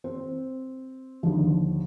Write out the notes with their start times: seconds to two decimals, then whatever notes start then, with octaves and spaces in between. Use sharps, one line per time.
0.04 C4
1.23 D#2 D3 F3